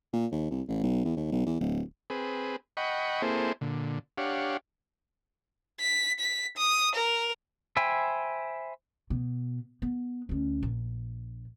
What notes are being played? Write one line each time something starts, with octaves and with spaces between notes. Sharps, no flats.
A#2
D#2
C2
A1
B1
E2
D#2
B1
E2
D1
C4 G#4 B4
D#5 F#5 G5 B5 C#6
A#3 C4 E4 G#4 A4 C5
A#2 D3
D4 G4 C#5 F5 F#5
B6
B6
D#6
A#4
C5 E5 G5 G#5 B5
B2
B3
D2 C#4
A#1